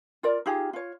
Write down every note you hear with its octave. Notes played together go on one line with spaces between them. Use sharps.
F4 A#4 D5
D#4 F4 G4 G#4
F4 C#5